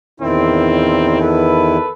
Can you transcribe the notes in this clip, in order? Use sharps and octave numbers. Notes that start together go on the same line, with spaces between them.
E2 A#2 D#3 C4 E4
A4 B4